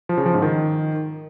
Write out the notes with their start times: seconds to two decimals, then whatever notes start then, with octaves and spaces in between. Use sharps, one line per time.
0.09 F3
0.17 C#3
0.26 F3
0.34 G#2
0.42 D#3